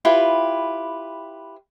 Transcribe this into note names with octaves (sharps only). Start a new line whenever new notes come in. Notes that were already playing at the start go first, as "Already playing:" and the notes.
E4 F4 G4 B4